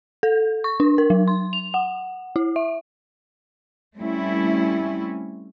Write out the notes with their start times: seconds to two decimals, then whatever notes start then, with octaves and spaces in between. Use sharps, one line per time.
0.23 A4
0.64 C#6
0.80 D4
0.98 A#4
1.10 F#3
1.28 C6
1.53 F7
1.74 F#5
2.36 E4
2.56 E5
3.97 G3 A3 C4 C#4 E4